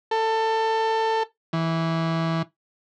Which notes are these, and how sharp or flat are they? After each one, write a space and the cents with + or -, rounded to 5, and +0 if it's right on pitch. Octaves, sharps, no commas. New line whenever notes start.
A4 +20
E3 -10